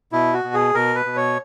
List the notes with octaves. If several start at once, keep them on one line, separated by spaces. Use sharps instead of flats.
B2 E4
F#4
B2
G#4
B2 A#4
B4
B2
C#5